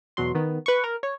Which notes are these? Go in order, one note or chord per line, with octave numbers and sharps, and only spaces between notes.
E2 B2 F#3 C6
D#3 B3
B4 C#6
A#4
C#5